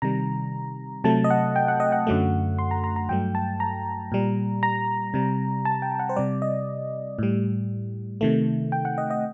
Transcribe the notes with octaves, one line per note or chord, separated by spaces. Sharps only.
C3 D#3 G3 A#5
C3 F#3 A3 A5
D#5
F#5
G5
F#5
D#5
F#5
F#2 D3 F#3 A3
C6
A#5
A#5
A#5
G2 F#3 A3 G5
A5
A#5
A#2 G3
A#5
C3 G3
A5
G5
F#5
C5
C3 G3 D5
D#5
A2 G3
C3 D#3 A3
G5
F#5
D#5
D#5